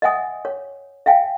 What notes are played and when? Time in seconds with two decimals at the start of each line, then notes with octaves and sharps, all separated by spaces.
0.02 D#5 E5 F#5 G#5 D#6
0.45 C#5
1.06 E5 F5 G5 G#5